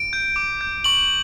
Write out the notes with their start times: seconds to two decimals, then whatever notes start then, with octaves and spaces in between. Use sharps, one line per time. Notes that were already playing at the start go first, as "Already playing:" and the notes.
Already playing: D7
0.13 G6
0.36 D6
0.61 G6
0.84 C#6 F#7